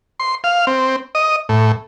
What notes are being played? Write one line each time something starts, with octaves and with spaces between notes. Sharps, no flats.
C6
F5
C4
D#5
A2